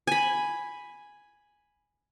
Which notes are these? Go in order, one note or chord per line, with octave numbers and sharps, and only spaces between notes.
G#5 B5